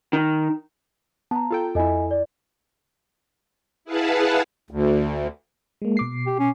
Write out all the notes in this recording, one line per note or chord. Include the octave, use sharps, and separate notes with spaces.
D#3
B3 A5 A#5
F4 A4 G5
F2 E4 A4 D#5 G#5
D5
E4 G#4 B4 F5 F#5 A5
D2
G#3 A#3
B2 D6 C7
G4
C#4